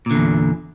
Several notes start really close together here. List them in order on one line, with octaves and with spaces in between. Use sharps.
A#2 D3 E2